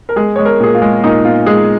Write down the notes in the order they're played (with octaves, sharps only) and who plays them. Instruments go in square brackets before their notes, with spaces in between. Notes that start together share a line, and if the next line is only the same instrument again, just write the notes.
[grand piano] A#4
G#3 G#4
G#3 C#5
A#4
A#2 G#4
F4
G#3
A#2 D#4
A#2 F4
G#3 G#4